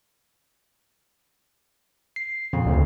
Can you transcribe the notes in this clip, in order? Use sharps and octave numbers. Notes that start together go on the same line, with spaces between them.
C7
F2 A#2 C#3
D2